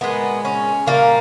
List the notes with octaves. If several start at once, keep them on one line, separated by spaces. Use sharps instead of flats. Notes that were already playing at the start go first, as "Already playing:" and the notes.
A#2 G#3 B3
C#4
A#2 G3 A#3